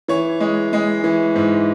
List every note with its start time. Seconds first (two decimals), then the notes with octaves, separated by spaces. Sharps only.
0.08 E3 C#5
0.40 G#3
0.73 G#3
1.04 E3
1.35 G#2